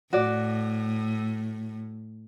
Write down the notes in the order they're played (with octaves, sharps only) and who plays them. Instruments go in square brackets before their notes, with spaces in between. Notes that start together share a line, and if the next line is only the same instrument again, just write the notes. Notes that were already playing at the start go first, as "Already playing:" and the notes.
[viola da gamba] A2 [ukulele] F#4 D5